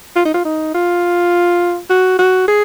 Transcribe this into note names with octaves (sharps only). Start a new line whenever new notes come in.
F4
D#4
F4
D#4
F4
F#4
F#4
G#4